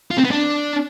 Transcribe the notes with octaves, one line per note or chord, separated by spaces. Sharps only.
F4
C4
B3
D4